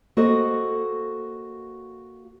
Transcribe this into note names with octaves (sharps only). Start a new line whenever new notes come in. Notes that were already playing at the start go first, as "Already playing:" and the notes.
A#3 F#4 A4 C5 D#5